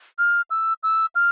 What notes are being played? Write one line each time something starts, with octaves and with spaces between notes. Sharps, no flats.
F6
E6
E6
F6